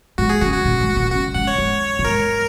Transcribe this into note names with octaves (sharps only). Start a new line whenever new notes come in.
G#2 F#4
G#4
C#3 F#4
F#4
A#2
G#2
A#2
C#3 F#4
G#2 F#5
C#5
G#2
A#2
G#2 A#4